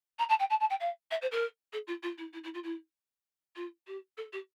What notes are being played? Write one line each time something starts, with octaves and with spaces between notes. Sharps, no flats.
A#5
A5
G5
A5
A5
G5
F5
E5
C5
A#4
A4
F4
F4
E4
E4
E4
F4
E4
F4
G4
A4
G4